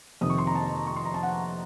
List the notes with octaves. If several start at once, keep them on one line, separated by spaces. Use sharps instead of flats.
F2 C3 D#3 D#6
C#6
C6
A#5
A5
C#6
C6
A#5
A5
F#5